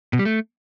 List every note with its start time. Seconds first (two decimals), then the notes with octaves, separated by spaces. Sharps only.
0.13 B2
0.19 G3
0.25 A3